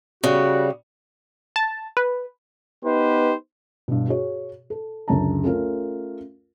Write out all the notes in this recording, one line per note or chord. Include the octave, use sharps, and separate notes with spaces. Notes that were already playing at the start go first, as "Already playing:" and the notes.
C#3 G3 F#4
A5
B4
B3 D#4 G4 B4 C5
G2 B2
F#4 G#4 C#5
A4
C#2 F#2 D3 A5 A#5
A3 C#4 F4 A#4